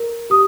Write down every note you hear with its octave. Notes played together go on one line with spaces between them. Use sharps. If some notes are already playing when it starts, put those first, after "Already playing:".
Already playing: A#4
G4 D#6